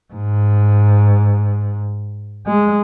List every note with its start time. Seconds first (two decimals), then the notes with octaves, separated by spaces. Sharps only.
0.14 G#2
2.47 G#3